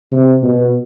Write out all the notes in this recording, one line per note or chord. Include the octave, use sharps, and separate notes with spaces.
C3
B2